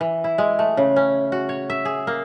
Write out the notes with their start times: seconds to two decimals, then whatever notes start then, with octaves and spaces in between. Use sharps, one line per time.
0.01 E3
0.24 E4
0.38 G#3
0.59 A3
0.77 C#3
0.96 C#4
1.32 F#4
1.49 C#5
1.70 E5
1.85 G#4
2.07 A#3